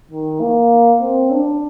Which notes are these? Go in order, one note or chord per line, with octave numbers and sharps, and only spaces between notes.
D#3
A#3
C4
D4